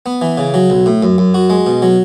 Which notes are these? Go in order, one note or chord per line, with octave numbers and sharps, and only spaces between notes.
B3
E3
C#3
F#3
B1
A2
F#2
F#2
F#4
G#3
B2
F#3